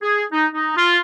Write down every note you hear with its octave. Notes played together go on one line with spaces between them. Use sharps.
G#4
D#4
D#4
F4